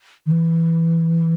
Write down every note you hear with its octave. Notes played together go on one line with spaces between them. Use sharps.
D#3
E3